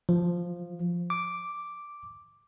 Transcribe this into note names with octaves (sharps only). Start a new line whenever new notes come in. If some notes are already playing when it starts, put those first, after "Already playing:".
F3
D6